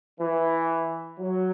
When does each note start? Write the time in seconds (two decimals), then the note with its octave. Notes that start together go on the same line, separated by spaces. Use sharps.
0.20 E3
1.20 F#3